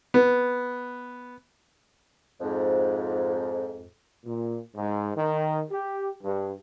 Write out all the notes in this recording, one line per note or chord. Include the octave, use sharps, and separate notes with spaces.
B3
F2 G#2
A#2
G#2
D#3
G4
G2